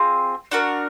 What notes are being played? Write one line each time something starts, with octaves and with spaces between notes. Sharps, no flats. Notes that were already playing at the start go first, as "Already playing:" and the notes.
Already playing: C4 F4 G#4
D4 F#4 A#4